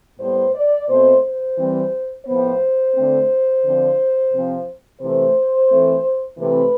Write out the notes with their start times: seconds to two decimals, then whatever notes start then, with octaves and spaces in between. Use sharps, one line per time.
0.20 A2 G3 B3 C5
0.55 D5
0.88 B2 A3 C4 C5
1.24 C5
1.58 E3 G3 C4
2.26 A2 F3 B3 C5
2.94 D3 A3 C4
3.63 D3 F3 C4
4.33 C3 F3 C4
5.01 C3 E3 A3 C5
5.69 E3 A3 C4
6.38 C3 E3 A3 C4 B4